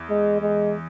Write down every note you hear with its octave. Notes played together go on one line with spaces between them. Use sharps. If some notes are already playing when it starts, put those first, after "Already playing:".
Already playing: E2
G#3
G#3